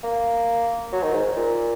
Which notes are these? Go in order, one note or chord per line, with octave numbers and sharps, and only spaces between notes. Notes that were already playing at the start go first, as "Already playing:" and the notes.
A#3
F#3
D#3
G#2
A#2